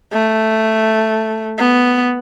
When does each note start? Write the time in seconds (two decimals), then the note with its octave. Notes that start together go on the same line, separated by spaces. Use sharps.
0.13 A3
1.58 B3